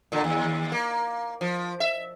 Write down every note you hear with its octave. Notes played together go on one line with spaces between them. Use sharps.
A#2 D3
D#2
A#3
F3
E5